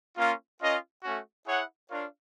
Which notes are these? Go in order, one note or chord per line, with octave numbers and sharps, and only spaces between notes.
A#3 C#4 F4
C#4 F4 A#4 D#5
A3 C#4 F#4
E4 G#4 C#5 F#5
D4 F4 A#4 C#5 F5